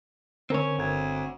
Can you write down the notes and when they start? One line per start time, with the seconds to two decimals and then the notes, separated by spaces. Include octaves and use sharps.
0.50 D3 C4 C#4 A#4 C#5
0.78 G1 D2 A4 G#6